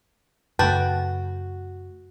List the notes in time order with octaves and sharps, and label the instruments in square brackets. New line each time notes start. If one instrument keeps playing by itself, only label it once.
[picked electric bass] F#2 C#3 A3 [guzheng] F#4 [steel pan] B4 G5 A5